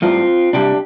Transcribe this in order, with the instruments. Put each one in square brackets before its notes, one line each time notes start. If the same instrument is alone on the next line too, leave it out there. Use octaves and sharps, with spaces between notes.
[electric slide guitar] A2 G3 C4 F4
C3 G3 D4 G4